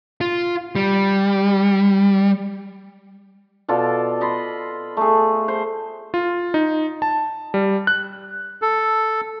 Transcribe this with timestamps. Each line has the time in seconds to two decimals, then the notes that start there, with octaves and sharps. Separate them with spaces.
0.21 F4
0.75 G3
3.68 B2 F4 A4 D5
4.21 D#5 B5 C6
4.97 A3 G#4
5.48 C5
6.14 F4
6.54 D#4
7.02 A5
7.54 G3
7.87 F#6
8.62 A4